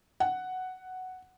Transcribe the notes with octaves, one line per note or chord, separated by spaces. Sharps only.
F#5